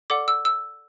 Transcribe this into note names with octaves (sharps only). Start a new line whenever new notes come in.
A4 D5 F#5 D6
E6
E6